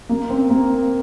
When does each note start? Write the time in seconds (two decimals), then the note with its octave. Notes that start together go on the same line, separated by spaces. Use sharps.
0.09 A#3
0.30 C4
0.49 A#3